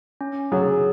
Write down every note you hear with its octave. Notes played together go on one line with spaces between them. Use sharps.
C#4
F#3 G#4